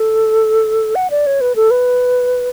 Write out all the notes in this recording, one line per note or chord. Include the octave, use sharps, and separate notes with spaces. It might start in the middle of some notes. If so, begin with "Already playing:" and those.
Already playing: A4
F#5
D5
C#5
B4
A4
B4